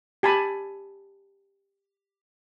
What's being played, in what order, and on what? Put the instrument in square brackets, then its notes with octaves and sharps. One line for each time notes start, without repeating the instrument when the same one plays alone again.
[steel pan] G4 G#5 A5 B5